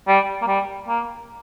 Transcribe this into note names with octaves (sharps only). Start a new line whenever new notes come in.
G3
A#3
G3
A#3